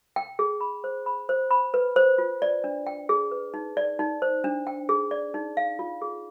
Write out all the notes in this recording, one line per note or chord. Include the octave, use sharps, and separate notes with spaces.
G5
G#4
B5
C5
B5
C5
B5
B4
C5
F4
D5
D4
G5
G#4
B4
D#4
D5
D#4
C5
D4
G5
G#4
D5
D#4
F5
F4
G#4